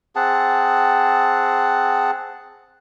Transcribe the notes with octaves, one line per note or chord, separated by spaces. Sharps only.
C4 G#4 F#5 A5